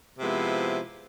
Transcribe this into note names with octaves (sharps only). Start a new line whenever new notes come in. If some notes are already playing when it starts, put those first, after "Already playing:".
C3 F3 G#3 B3 E4